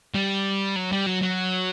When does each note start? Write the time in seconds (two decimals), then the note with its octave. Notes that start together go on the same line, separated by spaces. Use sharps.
0.14 G3
0.76 F#3
0.92 G3
1.06 F#3
1.22 F#3